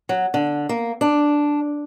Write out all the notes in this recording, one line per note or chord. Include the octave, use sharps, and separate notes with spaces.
F#3
D3
A#3
D4